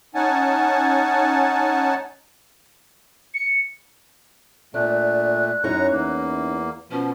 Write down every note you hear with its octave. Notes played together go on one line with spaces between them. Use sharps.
C#4 D#4 F#5 G#5 A5
C#7
A#2 A3 D4 F#6
F#2 C#4 D#4 E4 A#5 C#6
E2 A#3
B2 F3 C#4